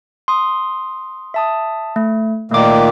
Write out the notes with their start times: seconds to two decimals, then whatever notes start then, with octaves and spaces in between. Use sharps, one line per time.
0.28 C6 D#6
1.34 E5 A5 D#6
1.96 A3
2.51 A#2 D#3 A3 A#3 D6